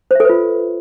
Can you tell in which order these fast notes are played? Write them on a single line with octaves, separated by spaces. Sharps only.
C5 E5 A4 B4 F4